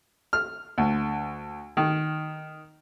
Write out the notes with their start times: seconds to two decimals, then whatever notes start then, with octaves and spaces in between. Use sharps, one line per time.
0.33 F6
0.78 D2
1.77 D#3